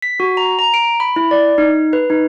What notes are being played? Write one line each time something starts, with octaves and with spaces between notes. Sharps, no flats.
B6
F#4
A#5
A#5
D7
B5
E4
D5
D#4
B4
D#4